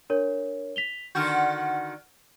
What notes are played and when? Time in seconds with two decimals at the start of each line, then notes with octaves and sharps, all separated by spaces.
0.10 D4 A#4 C#5
0.76 B6 F7 G7
1.15 D3 D#3 F#4 F6 G6